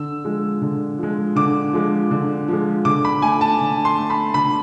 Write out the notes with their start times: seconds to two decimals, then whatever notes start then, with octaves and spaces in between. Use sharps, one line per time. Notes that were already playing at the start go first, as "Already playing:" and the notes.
Already playing: D3 E6
0.24 F3 G#3
0.62 D3
0.99 F3 G#3
1.36 D3 D6
1.73 F3 G#3
2.11 D3
2.48 F3 G#3
2.85 D3 D6
3.05 B5
3.22 A3 G#5
3.41 A5
3.61 D3
3.85 C6
3.97 A3
4.10 B5
4.34 D3 B5